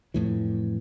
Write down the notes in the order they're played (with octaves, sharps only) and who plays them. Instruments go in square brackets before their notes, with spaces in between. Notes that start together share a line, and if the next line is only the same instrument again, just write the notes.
[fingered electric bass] F2 A2 E3